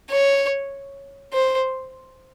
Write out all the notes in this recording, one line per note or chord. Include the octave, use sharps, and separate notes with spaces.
C#5
C5